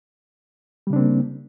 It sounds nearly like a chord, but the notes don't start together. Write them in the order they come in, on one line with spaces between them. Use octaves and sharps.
G3 C#3 D4 C4 A#3